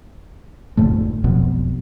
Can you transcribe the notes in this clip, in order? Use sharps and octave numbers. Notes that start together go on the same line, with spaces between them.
F1 D2 G#2 A3
E1 B1 F2 B2